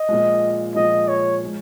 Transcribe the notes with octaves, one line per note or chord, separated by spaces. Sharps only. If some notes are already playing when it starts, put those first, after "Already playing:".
Already playing: D#5
A#2 F3 G#3
A#2 F3 G#3 D#5
C#5
F3 G#3